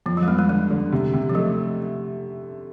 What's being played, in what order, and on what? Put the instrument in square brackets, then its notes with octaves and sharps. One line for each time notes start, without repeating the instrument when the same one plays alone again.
[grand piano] F2 [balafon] F3
[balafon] F#3
G#3
[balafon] G3 [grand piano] B3
[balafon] G#3
[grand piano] D3 [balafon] G#3
[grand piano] D3
C3
C3
[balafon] F3
[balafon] F#3 [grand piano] A3